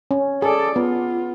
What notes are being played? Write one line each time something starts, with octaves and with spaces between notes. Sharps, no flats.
C#4
G#4 A4 D5
B3 F4